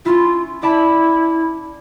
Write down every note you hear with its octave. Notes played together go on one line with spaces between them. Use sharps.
C#4 E4 F4
E4 D5 A5 B5